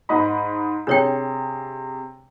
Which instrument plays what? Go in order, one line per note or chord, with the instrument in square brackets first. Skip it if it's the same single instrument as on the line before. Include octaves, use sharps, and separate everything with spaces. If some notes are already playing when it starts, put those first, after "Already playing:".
[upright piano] G#2 D#5 B5
[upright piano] C3 G#4 [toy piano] D4 C#5 G5